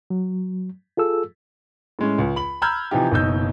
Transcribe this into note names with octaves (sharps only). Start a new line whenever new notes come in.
F#3
F4 G#4 A4 E6
A2 G#3 C#4
C#2
B5 F#7
A#5 B5 E6 F6 G6 G#6
C3 E3 F3 D#4 G4
F#1 B2 D#4 E6 G6